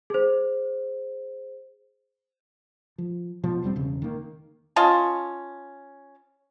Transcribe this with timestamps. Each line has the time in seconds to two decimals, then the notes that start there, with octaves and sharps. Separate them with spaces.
0.10 G#4 C5
2.98 F3
3.43 B2 F3
3.62 E1 G3 B3 C4
3.76 E1 C#3
4.02 D#3 A#3
4.76 C#4 F4 D#5 A5